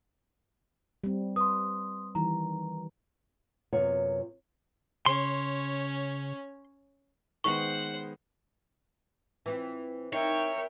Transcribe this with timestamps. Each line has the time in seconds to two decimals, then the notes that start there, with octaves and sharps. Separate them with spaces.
1.04 G3 C4
1.36 B4 C6 D#6
2.15 D#3 E3 G3 A#5
3.73 F#2 C3 B3 F4 C#5
5.06 C#3 C#4 C#5 C6
7.44 D#3 G#3 B3 C5 F#5 C#6
9.46 E3 C4 F4
10.13 D#4 A#4 C#5 E5 G5